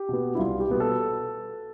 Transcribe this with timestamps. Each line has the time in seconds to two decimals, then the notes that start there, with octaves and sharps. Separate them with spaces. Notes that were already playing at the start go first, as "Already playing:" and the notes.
Already playing: G4
0.09 B2 B3
0.35 E4
0.39 C2 F4
0.60 G4
0.69 B2 B3
0.80 A4